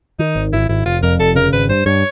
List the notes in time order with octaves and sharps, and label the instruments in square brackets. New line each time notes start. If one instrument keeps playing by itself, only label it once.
[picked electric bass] D#3 [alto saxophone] D#4
[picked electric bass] G#1
[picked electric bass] G#1 [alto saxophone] E4
[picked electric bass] G#1 [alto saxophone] E4
[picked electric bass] F1 [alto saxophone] F4
[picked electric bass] F2 [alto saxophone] A#4
[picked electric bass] F1 [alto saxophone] A4
[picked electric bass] C#3 [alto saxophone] A#4
[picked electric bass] G#1 [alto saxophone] B4
[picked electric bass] G2 [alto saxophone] C5
[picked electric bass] G2 [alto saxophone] C#5